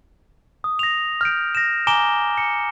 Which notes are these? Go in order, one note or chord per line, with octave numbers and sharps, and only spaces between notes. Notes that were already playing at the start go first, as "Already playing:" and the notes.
D#6
A#6 F7
F6 G6 D7
A#6 E7
G#5 A#5 D6 D7 E7 G7
C#7